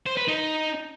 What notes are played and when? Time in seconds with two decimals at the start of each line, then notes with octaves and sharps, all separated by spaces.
0.06 C5
0.17 B4
0.28 D#4